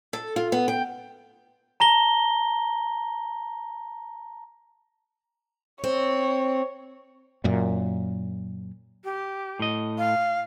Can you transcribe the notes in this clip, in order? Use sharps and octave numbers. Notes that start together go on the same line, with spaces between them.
A4
F4
B3
G5
A5 A#5 A#6 G7
C4 C#5
F#2 A#2
G4
A2 D#5
F5